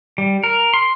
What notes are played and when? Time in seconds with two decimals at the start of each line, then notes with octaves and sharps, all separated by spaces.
0.18 G3
0.44 A#4
0.74 C6